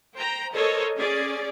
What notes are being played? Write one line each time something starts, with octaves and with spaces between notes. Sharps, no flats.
C5 G5 A#5
A4 A#4 C5 C#5 D#5
C#4 G#4 D5